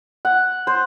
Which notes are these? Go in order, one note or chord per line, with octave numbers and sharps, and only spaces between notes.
F#5
C5